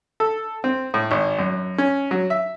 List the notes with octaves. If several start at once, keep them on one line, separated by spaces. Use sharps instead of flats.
A4
C4
A2
G#1
F#2
C#4
F#3
E5